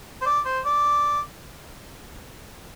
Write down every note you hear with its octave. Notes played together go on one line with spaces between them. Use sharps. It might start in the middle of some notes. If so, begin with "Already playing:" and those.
C5
D5
C5
D5